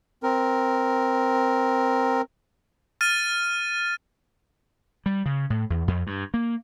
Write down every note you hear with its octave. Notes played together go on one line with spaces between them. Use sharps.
C4 A#4
F6 A6 D#7
G3
C#3
A2
E2
F2
G2
A#3